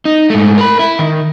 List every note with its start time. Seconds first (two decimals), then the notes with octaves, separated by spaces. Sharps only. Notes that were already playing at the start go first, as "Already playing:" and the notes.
0.05 D#4
0.30 G#2 A3
0.58 A#4 B5
0.79 E4
0.99 D#3